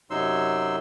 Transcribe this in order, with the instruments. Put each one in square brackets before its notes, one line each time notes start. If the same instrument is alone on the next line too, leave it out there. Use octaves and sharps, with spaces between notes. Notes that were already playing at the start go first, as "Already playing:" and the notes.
[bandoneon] F#2 C3 F#3 D#4 C6 E6